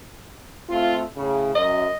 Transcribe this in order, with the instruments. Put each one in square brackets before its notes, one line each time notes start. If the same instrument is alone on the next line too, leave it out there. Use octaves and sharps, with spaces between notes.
[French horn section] A3 C4 F4
A2 C#3
[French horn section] F#2 [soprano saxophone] D#5